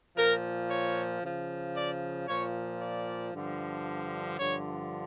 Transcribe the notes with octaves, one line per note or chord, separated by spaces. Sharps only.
A#2 F3 A#4
C#5
C#3 F3
D5
A#2 F3 C#5
D5
G2 D3 F3
G2 D3 F3 C#5